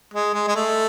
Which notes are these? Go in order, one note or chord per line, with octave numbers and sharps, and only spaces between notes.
G#3
G#3
G#3
A3